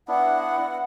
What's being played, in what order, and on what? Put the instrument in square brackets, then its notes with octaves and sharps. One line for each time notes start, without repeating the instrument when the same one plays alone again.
[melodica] B3 D4 E4 [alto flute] F#5